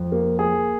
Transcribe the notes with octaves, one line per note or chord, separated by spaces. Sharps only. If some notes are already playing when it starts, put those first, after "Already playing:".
Already playing: F2
A#3
A#3 G#4